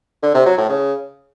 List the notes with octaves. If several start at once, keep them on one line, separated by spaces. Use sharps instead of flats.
D3
C3
F#3
A2
C#3